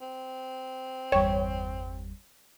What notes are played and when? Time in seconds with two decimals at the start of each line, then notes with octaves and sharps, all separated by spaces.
0.01 C4
1.12 G1 E2 G3 C#5 G5